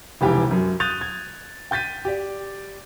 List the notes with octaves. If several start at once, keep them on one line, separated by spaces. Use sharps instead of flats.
F1 C#2 E3 G4 G5 G#5
F#2 F#3
D#6 F#6 G6 A6 D#7 F7
G#6
G5 G6 A6 B6 D#7
G4 D5